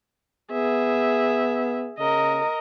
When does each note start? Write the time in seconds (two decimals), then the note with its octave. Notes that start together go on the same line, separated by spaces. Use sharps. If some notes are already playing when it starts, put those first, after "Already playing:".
0.52 B3 G#4 E5
1.99 C#3 A#4 D#5